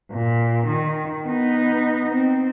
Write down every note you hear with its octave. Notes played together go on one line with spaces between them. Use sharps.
A#2
D#3
B3 D#4
C4